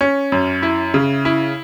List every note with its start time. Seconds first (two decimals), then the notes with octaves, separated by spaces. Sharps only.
0.01 C#4
0.32 F#2
0.63 E4
0.94 C#3
1.25 E4